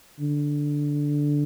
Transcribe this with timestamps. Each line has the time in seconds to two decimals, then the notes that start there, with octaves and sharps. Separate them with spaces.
0.19 D3